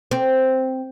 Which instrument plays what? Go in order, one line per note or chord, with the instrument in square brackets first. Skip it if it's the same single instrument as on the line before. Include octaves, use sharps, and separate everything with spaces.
[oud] C4